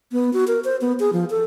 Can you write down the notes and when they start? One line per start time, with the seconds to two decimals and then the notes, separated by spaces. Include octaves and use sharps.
0.12 B3
0.33 F#4
0.48 A#4
0.64 C5
0.81 B3
1.00 G#4
1.13 F3
1.30 A4